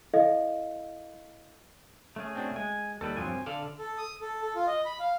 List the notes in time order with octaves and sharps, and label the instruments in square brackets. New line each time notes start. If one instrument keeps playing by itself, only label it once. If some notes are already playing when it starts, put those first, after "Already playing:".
[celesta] E4 A4 D#5 F5
[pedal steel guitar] A3 C#4 G#4
[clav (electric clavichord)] C4 D4 F#4
[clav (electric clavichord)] G#3 [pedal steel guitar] G#5
[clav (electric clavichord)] D#2 G3 B4 [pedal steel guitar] A4
[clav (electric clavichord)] G2 F3 F#3 [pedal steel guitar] C4 G#5
[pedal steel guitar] D3 [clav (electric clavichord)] A4 D5 F5
[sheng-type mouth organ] A4
D#6
A4
A4
F4
D#5
B5
F5